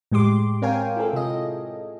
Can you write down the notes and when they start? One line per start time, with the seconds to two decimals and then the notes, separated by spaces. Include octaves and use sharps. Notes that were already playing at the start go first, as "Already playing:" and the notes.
0.12 A2 G#3 G4 C6 D6
0.62 C4 A#4 C#5 F5 G5 G#5
0.96 E4 F4 G#4 A4
1.13 C3 D#5